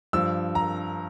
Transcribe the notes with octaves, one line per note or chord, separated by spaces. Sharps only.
G2 F3 E6
A#5